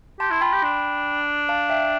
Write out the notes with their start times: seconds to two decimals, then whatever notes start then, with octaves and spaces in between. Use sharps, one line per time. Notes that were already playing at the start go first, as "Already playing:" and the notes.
0.20 G4 A5 C6
0.31 E4 C6
0.41 F4 G5 B5
0.53 G4
0.63 D4
1.49 F5 A5
1.70 E5 G5